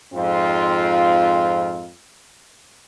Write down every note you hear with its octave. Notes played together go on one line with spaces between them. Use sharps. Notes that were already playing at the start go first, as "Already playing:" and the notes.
F2 G#2 C4 F4